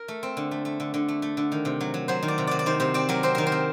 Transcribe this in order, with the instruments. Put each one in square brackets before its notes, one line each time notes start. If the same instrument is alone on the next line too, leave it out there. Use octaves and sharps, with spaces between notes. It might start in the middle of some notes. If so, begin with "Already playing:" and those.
Already playing: [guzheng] A#4
A3
C4
D3
A3
A3
D3
D3
A3
A3
D3
D#3
C3
F#3
F#3
F#3 C5
D#3
D5
C3
F#3 D5
D5
D#3 C5
C3 C5
C4 D5
F#3 A#4
C4 C5
D#3 A#4
C5
C4